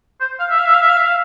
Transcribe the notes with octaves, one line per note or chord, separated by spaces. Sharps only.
C5
F5
E5
F5
E5
F5
E5
F5
E5
F5